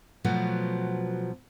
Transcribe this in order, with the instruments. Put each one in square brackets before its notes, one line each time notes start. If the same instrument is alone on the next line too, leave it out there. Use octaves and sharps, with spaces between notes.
[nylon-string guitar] B2 F3 F#3 A3 B3